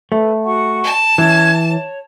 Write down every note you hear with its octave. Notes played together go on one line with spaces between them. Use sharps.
A3 A4 B4
F#4 F#5 C#6
A5
E3 C#4 G#6
C#5